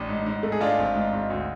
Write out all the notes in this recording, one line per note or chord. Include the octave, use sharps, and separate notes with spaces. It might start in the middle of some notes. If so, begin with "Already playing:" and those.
Already playing: A1 D4
G#2
G#2
A3
G#4
G#3 D4 F4
G#1
G#2
G#1
D2